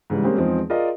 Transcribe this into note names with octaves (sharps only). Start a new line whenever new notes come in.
G#2 C#3 E3 G3
G3 G#3 A#3 C4 C#4 G4
E2 F3 G#3 C4 D#4
F4 G#4 A#4 D5 D#5 F5